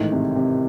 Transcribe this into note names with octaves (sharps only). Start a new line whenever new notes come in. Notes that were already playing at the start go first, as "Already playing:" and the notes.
Already playing: A1 G#2 D#3 A3
C3
C3